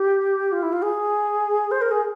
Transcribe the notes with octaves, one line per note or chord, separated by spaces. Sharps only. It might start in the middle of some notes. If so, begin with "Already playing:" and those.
Already playing: G4
F4
E4
F4
G#4
C5
A#4
G#4